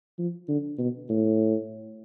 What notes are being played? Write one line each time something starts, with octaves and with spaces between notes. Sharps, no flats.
F3
D3
B2
A2